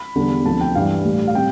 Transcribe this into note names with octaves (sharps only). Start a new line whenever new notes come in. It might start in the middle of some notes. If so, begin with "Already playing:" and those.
Already playing: B5
E2 D3 G3
D2 C3 F3 A5
G5
G2 E3 G3 F5
A2 G3
F5
C3 G3 G5